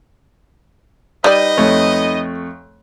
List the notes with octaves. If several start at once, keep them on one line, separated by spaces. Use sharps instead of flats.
G3 D#4 B4 D5 D#5
F2 A3 C#5